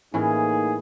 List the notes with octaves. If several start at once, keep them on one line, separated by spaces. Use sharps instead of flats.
A2 E3 A#3 C#4 D#4 G#4